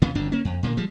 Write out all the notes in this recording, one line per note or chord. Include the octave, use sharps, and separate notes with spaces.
D2 C#3 B3
G1 F2 D4
A#3 C#4
F2
A#2 D3 A3 A#3
F3 G3 G#3